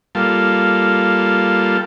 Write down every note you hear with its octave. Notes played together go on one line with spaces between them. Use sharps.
G3 A#3 F4 A4